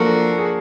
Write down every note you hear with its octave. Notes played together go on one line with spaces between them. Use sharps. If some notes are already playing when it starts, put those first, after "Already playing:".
Already playing: F3 A#3 D4 F#4 A4 A#4
G#4